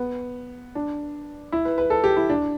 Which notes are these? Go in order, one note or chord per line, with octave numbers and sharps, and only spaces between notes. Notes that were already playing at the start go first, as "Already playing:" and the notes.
Already playing: B3
D4
E4
B4
B4
A4
G4
E4
D4